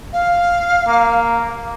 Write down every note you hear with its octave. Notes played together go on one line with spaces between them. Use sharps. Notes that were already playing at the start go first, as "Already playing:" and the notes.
F5
A#3